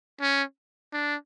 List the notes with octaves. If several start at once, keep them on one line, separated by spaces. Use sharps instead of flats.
C#4
D4